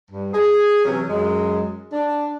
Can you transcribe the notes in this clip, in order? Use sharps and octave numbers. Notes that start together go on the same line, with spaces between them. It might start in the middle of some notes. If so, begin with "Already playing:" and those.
G2
G#4
C3 E3 F#3 C#4
F#2 G#3
D4